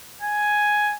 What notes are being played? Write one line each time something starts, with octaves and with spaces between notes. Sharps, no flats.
G#5